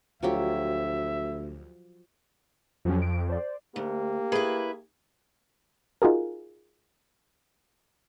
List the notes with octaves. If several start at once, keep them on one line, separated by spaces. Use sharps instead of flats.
D2 F3 F#3 G4 E5
F2 F3 F#3 C#4
D7
C5 D5
D2 A#3 G4
E4 G#4 B4
D#4 F4 F#4 G#4 A#4